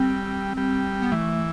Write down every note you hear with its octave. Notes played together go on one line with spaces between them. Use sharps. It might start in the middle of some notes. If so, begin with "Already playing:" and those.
Already playing: G3 C4
G3
B3
E3 A3